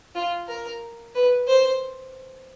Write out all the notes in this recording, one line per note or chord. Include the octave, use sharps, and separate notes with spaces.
F4
A#4
B4
C5